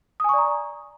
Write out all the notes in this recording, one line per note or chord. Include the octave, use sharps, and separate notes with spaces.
D5 G#5 A#5 C#6 D#6